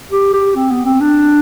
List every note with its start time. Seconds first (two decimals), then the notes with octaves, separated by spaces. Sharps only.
0.11 G4
0.34 G4
0.55 C4
0.71 B3
0.86 C4
1.01 D4